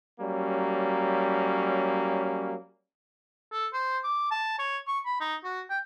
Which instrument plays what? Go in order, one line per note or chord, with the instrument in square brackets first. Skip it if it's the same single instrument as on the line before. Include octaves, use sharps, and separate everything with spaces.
[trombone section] F#3 G3 A#3 C#4
[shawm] A4
C5
D6
A5
C#5
C#6
B5
D#4
F#4
G5